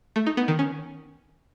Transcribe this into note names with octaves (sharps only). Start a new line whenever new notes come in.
A3
D#4
B3
D#3
C#4